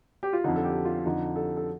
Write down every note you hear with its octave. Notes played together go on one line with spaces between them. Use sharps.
G4
F4
F2 D3 D#4
A4
G4
F4
F2 D3 D#4
A4
A4